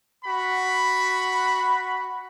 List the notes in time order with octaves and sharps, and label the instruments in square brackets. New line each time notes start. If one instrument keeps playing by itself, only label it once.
[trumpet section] F#4 B5